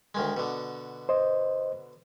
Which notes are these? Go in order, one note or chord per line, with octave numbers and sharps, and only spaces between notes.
D2 D#3 G#3
B2 D3
C5 D#5